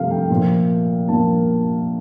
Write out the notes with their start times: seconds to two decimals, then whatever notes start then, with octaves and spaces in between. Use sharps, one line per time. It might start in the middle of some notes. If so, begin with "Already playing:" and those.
Already playing: C3 F3 A3 F5
0.11 G5
0.30 A#2 F3 A#3
1.08 A#2 F3 A#3 A5